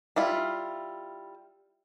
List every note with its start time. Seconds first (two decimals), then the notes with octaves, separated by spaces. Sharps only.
0.16 G3 E4 F4